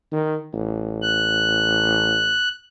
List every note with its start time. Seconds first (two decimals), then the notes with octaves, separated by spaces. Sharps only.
0.12 D#3
0.53 A1
1.02 F#6